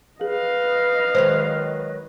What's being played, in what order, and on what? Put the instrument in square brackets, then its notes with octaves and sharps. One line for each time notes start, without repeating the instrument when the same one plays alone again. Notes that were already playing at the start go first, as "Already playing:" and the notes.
[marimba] G#4 [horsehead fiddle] B4 D#5 [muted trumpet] F5
[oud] D#3 F#3 G#3 [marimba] C5